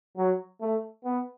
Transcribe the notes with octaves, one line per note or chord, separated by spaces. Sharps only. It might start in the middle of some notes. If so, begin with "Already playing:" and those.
F#3
A3
B3